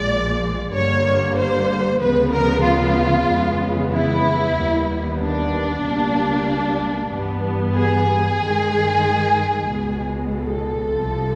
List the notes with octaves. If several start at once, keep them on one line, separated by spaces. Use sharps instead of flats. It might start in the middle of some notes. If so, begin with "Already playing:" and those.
Already playing: A#1 A#2 F3 G#3 D5
G1 G2 D3 G3 A#3 C#5
C5
D2 C#3 F3 G#3 B3 B4
A#4
F4
F2 C#3 E3 G#3 B3
E4
D#2 D#3 G3 B3
D4
C#2 B2 G3 A#3
G2 E3 G3 B3
G#4
G2 D#3 G#3
C#2 B2 G#3
A4
C2 C3 F3